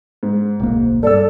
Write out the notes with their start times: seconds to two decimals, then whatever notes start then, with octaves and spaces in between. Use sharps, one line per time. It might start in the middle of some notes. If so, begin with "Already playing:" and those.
0.23 G#2
0.60 D1 B1 A#3
1.03 G2 A4 D5 E6